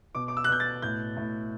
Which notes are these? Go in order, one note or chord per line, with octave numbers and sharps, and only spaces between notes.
B2 D6
D6
E6
F#6
B2 G6
A6
A2 G6
A2